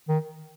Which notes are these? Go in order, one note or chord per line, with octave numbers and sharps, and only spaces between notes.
D#3